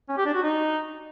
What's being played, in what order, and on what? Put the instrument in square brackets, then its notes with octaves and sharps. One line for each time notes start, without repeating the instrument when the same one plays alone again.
[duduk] C#4
G4
D4
F#4
D#4